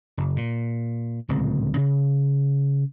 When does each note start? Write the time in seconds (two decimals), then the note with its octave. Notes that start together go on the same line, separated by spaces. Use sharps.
0.17 F#1
0.36 A#2
1.29 D1 C#2 A#2 C4
1.77 C#3